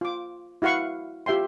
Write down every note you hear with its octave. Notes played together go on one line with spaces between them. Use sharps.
F4 D6
E4 F#4 F5 F#5 C#6
F4 G4 E5 G5 C6